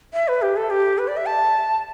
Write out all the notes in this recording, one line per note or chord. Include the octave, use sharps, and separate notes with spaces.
E5
B4
G4
A4
G4
B4
D5
E5
A5